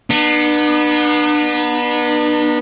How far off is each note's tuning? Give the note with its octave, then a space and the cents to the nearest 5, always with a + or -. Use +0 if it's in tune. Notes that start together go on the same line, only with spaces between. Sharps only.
B3 -25 D4 +40